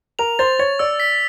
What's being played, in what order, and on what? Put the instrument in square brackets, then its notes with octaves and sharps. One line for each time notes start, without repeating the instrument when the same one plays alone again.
[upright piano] A#4 [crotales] F7
[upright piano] C5 [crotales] A6
[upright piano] C#5 [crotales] A6
[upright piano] D5 [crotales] E6
[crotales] B6